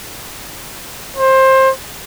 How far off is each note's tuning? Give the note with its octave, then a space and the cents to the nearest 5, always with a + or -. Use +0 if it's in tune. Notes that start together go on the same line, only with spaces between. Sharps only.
C5 +20